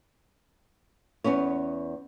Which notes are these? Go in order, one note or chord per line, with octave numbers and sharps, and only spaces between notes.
E2 B3 C#4 C#5